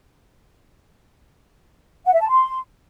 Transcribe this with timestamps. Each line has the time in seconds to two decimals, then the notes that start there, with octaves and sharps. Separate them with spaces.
2.06 F#5
2.13 E5
2.21 A5
2.29 C6